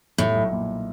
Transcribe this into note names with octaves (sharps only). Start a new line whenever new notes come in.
A2 G3
B1
A#2